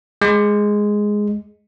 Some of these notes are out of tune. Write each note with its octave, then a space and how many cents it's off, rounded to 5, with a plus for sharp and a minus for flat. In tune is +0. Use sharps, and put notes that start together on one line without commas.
G#3 +0